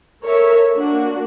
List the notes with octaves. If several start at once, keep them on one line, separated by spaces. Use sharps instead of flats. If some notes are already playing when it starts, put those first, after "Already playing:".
A4 A#4 C#5 E5
A#3 D4 F#4